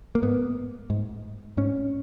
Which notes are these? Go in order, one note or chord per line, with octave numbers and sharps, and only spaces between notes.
A#3
G#2 B3
G#2
G#2 C#4